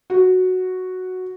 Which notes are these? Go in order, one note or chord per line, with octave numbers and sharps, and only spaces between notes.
F#4